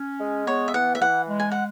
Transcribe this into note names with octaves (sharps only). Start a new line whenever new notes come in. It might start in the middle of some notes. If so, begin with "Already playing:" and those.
Already playing: C#4
G#3
B3 C#5
E5
E3 F#5
E5
E3 F#5
G#3
G#5
F#5